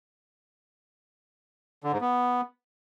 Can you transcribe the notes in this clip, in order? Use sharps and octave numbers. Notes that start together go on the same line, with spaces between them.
D3
G#2
B3